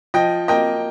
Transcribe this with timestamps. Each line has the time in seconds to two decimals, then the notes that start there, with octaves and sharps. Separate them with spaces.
0.14 F3 D#5 G5
0.48 A#3 D#5 G5